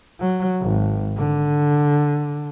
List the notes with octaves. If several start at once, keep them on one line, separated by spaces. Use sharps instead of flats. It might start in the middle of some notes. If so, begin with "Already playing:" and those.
F#3
G#1
D3